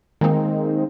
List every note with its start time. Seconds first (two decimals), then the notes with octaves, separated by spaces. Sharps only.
0.21 D#3 G#3 A#3 C4 D#4